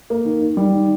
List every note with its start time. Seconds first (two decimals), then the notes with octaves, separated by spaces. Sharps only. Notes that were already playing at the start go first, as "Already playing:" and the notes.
0.10 A#3
0.25 D#3
0.41 D#3
0.57 G3
0.73 D#3